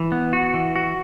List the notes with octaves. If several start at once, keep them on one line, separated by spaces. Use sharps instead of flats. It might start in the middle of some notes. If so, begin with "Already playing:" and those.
Already playing: E3
B3
F#4
E3
F#4